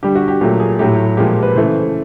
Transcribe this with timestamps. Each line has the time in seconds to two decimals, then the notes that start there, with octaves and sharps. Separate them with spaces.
0.03 D3 G3 G4
0.15 F#4
0.28 G4
0.41 A#2 F#3 A3 G4
0.60 G#4
0.79 A2 F#3 A3 G4
1.17 A#2 F3 G#3 G4
1.31 G4
1.43 B4
1.55 C#3 E3 A3 C5